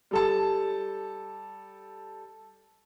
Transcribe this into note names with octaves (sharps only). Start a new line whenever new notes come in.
G3 A4 A5